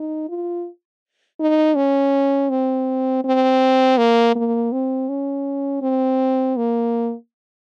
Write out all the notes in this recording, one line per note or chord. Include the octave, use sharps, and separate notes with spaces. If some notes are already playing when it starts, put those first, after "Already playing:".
Already playing: D#4
F4
D#4
C#4
C4
C4
A#3
A#3
C4
C#4
C4
A#3